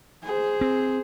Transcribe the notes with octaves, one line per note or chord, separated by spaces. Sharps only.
G#4 C5
C4